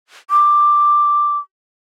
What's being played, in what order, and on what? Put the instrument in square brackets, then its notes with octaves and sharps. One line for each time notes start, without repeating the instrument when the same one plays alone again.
[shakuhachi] D6